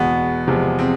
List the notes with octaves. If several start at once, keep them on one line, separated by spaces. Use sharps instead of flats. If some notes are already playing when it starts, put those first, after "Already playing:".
Already playing: E2 B2 G#3 B3
E2 C3 F3 G#3
C4